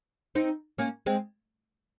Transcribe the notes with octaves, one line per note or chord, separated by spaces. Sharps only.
C4 D#4
A#3 C#4
G#3 C4